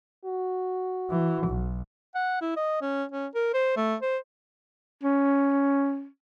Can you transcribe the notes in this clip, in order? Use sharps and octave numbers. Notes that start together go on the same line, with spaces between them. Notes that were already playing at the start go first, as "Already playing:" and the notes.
F#4
E3
B1
F#5
E4
D#5
C#4
C#4
A#4
C5
A3
C5
C#4